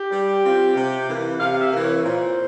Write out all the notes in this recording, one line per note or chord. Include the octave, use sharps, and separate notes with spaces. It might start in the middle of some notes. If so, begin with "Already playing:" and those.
Already playing: G4
G3
C4 F4
C3
E3 A#3
C3 F5
F5
E5
E3 A#3
C#5
A#2 C5